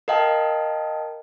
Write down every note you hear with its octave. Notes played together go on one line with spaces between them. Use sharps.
A#4 D#5 F5 G5 A5